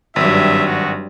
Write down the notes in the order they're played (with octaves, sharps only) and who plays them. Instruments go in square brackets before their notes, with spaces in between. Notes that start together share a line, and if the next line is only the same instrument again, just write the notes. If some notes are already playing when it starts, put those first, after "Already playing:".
[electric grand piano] G#1 [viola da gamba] G2 F#3 [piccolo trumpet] E5
[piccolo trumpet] F#4